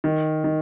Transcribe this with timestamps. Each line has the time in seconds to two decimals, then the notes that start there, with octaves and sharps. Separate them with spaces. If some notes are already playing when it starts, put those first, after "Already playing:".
0.04 D#3
0.44 D#3